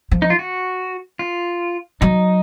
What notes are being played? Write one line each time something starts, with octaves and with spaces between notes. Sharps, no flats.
F3
D#4
F4
F#4
F4
F#3 D#4